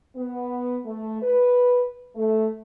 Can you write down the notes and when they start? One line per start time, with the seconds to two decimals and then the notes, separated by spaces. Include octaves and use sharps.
0.16 B3
0.85 A3
1.22 B4
2.16 A3